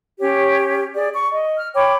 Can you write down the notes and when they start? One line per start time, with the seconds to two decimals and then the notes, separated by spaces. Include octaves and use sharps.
0.20 C#4 G4 C#5
0.95 G#4 D5
1.15 C#6
1.32 D#5
1.58 F6
1.74 C#5 G5 B5 D6